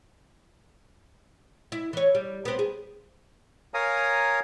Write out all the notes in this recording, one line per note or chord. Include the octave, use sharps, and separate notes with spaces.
E4
E3 C#5
G3
B3 C4
G#4
A#4 C#5 F5 G#5 A#5 D#6